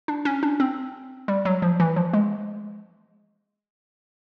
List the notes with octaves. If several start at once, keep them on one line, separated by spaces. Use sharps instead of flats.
D4
C#4
D4
C4
G3
F#3
F3
E3
F3
G#3